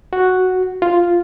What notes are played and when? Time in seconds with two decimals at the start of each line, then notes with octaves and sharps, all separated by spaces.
0.13 F#4
0.82 F4